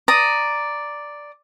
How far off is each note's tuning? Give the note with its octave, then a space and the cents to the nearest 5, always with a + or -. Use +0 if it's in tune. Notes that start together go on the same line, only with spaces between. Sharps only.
D5 +0 A#5 +0 D#6 +0